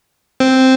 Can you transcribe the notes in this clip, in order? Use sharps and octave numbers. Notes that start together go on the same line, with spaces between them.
C4